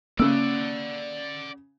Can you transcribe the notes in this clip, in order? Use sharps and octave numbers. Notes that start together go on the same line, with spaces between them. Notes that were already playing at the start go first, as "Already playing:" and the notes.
C#3 A#3 D5 F#5 E6